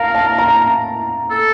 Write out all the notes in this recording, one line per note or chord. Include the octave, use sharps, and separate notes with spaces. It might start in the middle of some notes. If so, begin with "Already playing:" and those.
Already playing: A#4 F5 A5
A5
A#5
A4